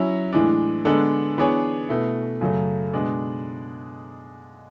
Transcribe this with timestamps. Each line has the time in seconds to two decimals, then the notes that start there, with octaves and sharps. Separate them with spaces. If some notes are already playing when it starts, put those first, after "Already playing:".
Already playing: F#3 C#4 E4
0.33 A2 E3 G#3 D4
0.85 D3 G#3 B3 D4 A4
1.37 E3 B3 D4 G#4 C#5
1.89 B2 A3 E4
2.41 F#2 C#3 F#3 A3
2.93 B2 G#3 D4